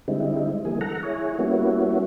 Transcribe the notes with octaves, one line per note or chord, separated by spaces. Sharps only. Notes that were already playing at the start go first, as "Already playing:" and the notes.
D3 G3 G#3 C4 D#4 E4
E3 G3 A#3 G#4
A4 F#5 A#5
E4 G#4 C#5
G3 A#3 B3 C#4 E4 F#4